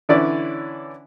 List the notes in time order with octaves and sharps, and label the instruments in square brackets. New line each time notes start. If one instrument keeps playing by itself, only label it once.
[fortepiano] D3 E3 C#4 E4 C#5 D5